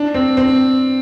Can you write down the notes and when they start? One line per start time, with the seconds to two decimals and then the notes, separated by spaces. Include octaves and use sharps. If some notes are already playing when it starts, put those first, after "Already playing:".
Already playing: D4
0.14 C4
0.37 C4